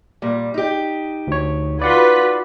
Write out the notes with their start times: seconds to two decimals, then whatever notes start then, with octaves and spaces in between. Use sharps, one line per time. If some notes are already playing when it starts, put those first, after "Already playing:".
0.22 A#2 G3
0.54 D#4 G4
1.27 D2 C#5
1.82 F4 F#4 B4 D5 F#5 C6